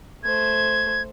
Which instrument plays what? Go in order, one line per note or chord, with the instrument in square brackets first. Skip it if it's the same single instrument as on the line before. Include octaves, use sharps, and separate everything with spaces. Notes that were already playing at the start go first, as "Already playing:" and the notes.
[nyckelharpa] A3 C5 [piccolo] G#6